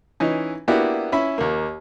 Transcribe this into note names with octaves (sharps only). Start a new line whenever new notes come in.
E3 C#4 D#4
A#3 B3 D4 E4 F#4 G4
C#4 E4 E5 B5
D#2 A#3